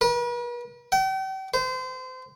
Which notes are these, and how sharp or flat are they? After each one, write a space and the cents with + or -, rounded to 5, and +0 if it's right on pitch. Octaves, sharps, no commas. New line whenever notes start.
B4 -45
G5 -40
C5 -30